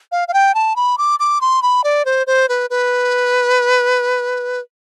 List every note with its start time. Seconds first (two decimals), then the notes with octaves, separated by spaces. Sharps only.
0.12 F5
0.28 F5
0.34 G5
0.55 A5
0.76 B5
0.98 D6
1.20 D6
1.41 C6
1.62 B5
1.84 D5
2.05 C5
2.27 C5
2.49 B4
2.70 B4